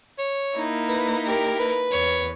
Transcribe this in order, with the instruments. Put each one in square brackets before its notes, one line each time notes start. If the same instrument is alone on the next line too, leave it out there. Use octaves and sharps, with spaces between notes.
[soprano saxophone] C#5
[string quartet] A#3 D#4 E4
[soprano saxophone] B4
[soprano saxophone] G4 [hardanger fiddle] A#4
[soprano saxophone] B4
[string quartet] E2 [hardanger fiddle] C#5